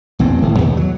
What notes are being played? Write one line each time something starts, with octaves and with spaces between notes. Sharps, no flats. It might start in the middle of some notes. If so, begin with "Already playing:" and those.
A#1 E2 G2 C4
D1 A2
D#2 B2
F#3